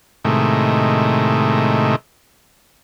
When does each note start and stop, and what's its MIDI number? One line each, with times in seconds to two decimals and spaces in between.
0.25 1.96 45
0.25 1.96 48
0.25 1.96 51
0.25 1.96 56
0.25 1.96 57